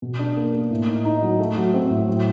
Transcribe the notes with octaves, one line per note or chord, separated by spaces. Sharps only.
B2
D4
A#3
A#3
A2
D#4
D#4
F#3
A3
F#3
C4
A2
F#3